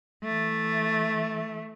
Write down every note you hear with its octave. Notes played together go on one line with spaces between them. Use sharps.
E3 A3